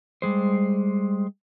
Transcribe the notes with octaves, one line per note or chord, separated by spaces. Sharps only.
G3 G#3 C5